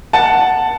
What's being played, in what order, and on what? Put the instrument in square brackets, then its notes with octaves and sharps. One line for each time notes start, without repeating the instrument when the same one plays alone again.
[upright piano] F#5 A5